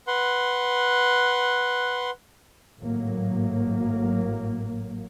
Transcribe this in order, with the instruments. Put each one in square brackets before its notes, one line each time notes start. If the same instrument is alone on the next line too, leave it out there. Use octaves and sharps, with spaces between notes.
[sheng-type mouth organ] B4 F#5 C6
[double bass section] G#1 A2 F#3 A#3